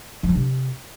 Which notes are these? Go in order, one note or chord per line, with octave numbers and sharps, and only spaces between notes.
F3
D4
C3